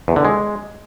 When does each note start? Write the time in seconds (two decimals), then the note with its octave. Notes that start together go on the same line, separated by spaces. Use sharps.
0.08 E2
0.16 D3
0.25 G#3